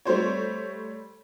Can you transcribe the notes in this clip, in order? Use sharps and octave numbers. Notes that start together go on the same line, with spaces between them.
G3 A3 C5 C#5